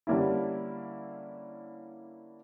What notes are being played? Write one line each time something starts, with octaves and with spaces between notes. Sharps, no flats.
D3 G3 A#3 C#4 E4